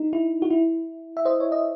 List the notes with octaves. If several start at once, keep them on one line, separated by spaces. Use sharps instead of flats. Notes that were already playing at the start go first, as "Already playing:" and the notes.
Already playing: D#4
E4
F#4
E4
E5
C5 D#5
C#5
D#5